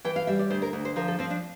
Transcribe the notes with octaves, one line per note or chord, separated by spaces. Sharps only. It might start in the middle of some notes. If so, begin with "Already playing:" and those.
E3 G5
F5
G3 E5
D5
D2 C5
A#4
D2
C5
F3 A#4
A4
F3 C4
D4